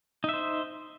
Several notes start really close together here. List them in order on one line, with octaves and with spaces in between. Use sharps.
D#4 E5 C5